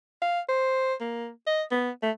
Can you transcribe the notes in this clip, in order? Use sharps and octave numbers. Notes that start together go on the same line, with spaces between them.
F5
C5
A#3
D#5
B3
A3